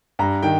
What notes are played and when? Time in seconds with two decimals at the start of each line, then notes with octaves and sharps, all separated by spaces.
0.19 G2 A#5
0.43 D#3 G5